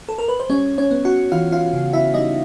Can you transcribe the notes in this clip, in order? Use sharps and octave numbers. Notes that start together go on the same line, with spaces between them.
A4
A#4
B4
C5
G3 C#4 C#5
C#4 C#5
B3
F#4 F#5
E3 F4 F5
F4 F5
C#3
E4 E5
G3 D#4 D#5